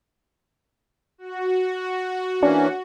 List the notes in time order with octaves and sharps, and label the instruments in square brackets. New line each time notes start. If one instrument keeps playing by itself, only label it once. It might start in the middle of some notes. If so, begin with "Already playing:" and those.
[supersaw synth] F#4
[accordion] E3 A#3 C#4 [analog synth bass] D4